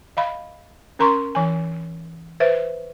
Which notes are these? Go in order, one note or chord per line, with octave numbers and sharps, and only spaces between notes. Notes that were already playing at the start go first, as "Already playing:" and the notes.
D#5 F5 B5
C#4 A#4 A#5 C6 C#6
E3 G#5
B4 C5 E5